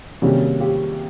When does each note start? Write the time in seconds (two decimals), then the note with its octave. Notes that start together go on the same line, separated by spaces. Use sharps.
0.22 C3 D#3 G3 A#3 C#4 F#4 G#4
0.60 F4 G4